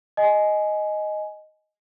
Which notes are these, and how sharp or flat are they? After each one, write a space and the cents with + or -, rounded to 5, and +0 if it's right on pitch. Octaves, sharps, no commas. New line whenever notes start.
D#5 +0 G#5 +15